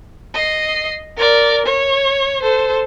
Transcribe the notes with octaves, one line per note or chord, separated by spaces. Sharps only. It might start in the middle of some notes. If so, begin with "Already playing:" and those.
D#5 C7
A#4 D5
C#5
A4 C5